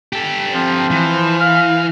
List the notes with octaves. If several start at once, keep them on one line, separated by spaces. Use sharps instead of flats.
G4 A4
F3 C4
E3
F5 F6